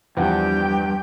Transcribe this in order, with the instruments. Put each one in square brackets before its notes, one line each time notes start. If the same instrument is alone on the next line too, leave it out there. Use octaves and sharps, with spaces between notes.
[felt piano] E2 F3 F#5 [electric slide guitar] G2 [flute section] G4 G5 G6